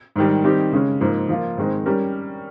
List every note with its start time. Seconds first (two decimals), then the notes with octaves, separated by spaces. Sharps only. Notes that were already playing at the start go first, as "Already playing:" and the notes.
0.16 G#2 D#3 G3
0.44 D#3 G3 C4 D#4 G4
0.72 C#3 G#3 C#4
1.01 G#2 F3 A#3
1.29 F3 A#3 F4
1.57 G#2 D#3 G#3 C4 D#4
1.86 G3 C#4 G4 A#4